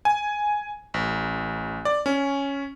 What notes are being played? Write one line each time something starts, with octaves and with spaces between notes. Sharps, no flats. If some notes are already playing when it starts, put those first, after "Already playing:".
G#5
A1
D5
C#4